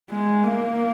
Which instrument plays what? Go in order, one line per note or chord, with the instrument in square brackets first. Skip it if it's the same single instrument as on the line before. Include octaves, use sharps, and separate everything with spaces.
[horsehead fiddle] G#3
A#3